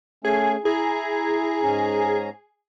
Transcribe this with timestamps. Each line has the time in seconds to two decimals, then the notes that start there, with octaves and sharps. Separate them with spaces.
0.25 A3 C#4 G#4
0.65 E4 G#4 A#5
1.63 G#2 C#4 A#5